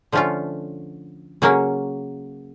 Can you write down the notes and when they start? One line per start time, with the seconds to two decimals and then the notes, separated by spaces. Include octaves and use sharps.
0.12 D3 F3 A3 C#4 F4
1.42 C#3 F#3 A#3 C#4